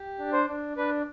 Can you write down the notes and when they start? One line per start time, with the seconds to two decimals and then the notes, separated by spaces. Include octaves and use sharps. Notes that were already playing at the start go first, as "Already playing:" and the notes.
Already playing: G4
0.19 D4
0.33 C5
0.48 D4
0.77 D4 B4